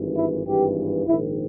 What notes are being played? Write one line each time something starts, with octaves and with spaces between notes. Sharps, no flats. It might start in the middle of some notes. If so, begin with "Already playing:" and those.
Already playing: G#1 G2 E3
E4
G#1 G2 E3 G4
A#1 G#2 D#3 E4